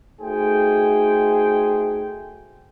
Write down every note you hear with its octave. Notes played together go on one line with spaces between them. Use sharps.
A3 D#4 F#4 G#4 C5 G5